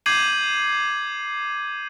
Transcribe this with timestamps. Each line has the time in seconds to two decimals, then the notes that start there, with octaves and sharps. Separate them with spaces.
0.06 D6 G6 G#6 C7 D#7 F#7